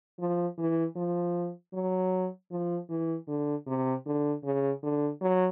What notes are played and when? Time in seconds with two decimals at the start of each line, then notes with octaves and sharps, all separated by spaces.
0.19 F3
0.58 E3
0.96 F3
1.73 F#3
2.51 F3
2.89 E3
3.28 D3
3.67 C3
4.06 D3
4.44 C#3
4.83 D3
5.21 F#3